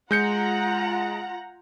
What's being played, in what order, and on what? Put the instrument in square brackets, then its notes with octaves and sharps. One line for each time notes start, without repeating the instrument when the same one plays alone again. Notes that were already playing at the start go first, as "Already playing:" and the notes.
[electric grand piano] G#3 G6 C#7 [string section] F4 F#5 A#5